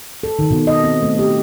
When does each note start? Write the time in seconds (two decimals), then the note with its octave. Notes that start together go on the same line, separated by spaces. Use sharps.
0.23 A4
0.39 D#3
0.51 B2
0.67 D#5
0.84 C4
1.03 A3
1.19 G4